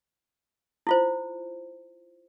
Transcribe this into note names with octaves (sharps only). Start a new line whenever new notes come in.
E4 F4 C5